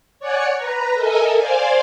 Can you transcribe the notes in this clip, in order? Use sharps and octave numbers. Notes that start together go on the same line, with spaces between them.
C#5 D5 F#5 G#5 C#6
B4 A#5
A4 A#4 D#5 E5 G#5
C5 D5 F5 G#5